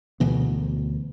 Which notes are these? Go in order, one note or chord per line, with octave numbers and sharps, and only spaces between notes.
D2 B2 E3 B3